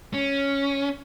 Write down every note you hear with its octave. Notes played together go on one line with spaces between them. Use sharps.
C#4